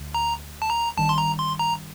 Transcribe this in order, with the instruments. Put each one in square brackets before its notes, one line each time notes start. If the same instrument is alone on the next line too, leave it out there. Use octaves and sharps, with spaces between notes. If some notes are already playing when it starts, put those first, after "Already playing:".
Already playing: [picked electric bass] D2
[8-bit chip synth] A#5
A5
A#5
[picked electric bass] G1 G2 D#3 [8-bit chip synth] A5
[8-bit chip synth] C6
A#5
C6
A#5